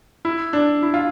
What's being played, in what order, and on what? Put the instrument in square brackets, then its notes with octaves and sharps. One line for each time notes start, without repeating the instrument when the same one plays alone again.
[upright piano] E4
D4
E4
F4